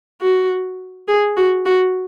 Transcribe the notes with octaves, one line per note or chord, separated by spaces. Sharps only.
F#4
G#4
F#4
F#4